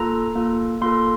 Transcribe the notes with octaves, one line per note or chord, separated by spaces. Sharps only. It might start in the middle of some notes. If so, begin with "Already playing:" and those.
Already playing: A#3 F4 A4 A#5
A#3 F4 A4
A#3 F4 A4 C6